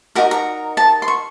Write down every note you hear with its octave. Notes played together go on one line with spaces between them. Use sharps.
D#4 F#4 A#4 A#5
A#5
A5
C6
C#6